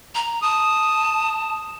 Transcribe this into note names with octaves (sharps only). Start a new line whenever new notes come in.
A#5
A5 D#6